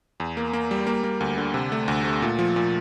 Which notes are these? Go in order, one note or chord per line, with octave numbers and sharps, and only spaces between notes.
E2
A#3
A#3
G3
A#3
A#3
D2
D3
C3
A3
D2
A3
A#2
F3
A#2